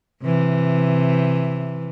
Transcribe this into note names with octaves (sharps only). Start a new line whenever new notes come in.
C3 E3